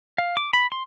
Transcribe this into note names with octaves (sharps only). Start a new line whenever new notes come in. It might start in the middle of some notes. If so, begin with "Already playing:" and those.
F5
D6
B5
C6